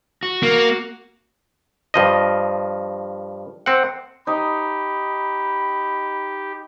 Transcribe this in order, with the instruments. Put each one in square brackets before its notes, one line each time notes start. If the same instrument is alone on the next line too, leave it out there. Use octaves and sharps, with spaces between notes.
[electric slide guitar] F#4
[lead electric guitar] A#3
[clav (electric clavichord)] G2 F3 D#5
C4 F#5
[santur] D#4 [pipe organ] G4 [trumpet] B5